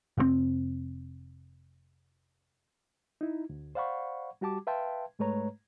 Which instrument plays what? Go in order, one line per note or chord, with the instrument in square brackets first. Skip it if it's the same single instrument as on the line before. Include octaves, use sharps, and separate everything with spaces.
[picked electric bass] F1 A#2 C4
[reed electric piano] D#4 E4
D2
C5 D5 F5 F#5 B5 C#6
G3 F#4 G4 A5 D6
B4 E5 F5 G5 A5 C6
G#2 G#3 A3 B4 C#5 A#5